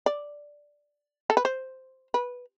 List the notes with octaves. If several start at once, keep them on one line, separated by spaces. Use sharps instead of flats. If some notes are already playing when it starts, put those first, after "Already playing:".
D5
A4
B4
C5
B4